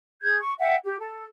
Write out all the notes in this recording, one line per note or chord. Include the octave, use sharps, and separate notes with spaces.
G#4 G6 G#6
C#6
E5 F#5 G5
G4
A4